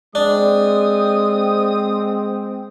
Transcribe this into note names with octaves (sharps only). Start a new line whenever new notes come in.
G#3 C4 D4 D#6